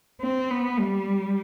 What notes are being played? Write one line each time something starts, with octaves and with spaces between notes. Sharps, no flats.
C4
B3
G3